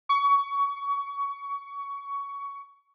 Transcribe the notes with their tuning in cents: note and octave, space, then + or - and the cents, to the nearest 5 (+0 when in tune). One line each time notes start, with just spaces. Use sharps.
C#6 +20